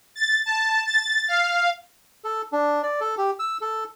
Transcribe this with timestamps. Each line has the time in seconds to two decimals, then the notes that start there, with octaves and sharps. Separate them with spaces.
0.16 A6
0.46 A5
0.86 A6
1.28 F5
2.24 A4
2.52 D4
2.83 D5
3.00 A4
3.18 G4
3.39 E6
3.61 A4